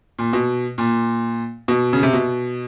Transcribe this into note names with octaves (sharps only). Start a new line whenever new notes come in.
A#2
B2
A#2
B2
C#3
C3
B2